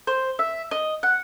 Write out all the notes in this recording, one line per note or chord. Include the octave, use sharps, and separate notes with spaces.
C5
E5
D#5
F#5